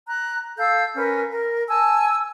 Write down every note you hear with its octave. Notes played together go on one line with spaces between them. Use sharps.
A#5 F#6
A4 F5 E6 G6
C#4 A#4 B4
A#4
G#5 A5 E6